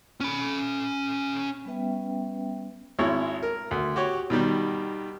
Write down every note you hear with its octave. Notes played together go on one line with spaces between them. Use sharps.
C#4 B5
G3 B3 C#4 B4 E5 G5
G#1 G#3 E4 C#5
A#4
D2
F#4 G4 C#5
B2 D#3 G3